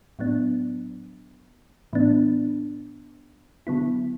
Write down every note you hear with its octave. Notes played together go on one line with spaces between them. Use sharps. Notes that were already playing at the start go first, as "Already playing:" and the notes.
A2 F#3 B3 D4
A2 E3 B3 D4
D3 F#3 B3 E4